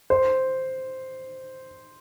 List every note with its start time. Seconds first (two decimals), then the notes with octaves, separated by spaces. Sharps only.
0.10 C5